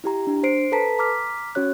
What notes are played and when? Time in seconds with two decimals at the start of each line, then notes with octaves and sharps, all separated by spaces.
0.04 E4 G4 A#5
0.27 D4
0.43 C5 C7 D7
0.72 A4 B4 A5 A#5 B6
0.99 A#5 D6 F6 B6
1.55 C#4 F#4 C#5 F#6